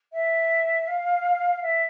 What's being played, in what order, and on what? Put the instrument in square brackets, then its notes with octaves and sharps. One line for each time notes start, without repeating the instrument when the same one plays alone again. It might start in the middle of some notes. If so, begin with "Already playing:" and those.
[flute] E5
F5
E5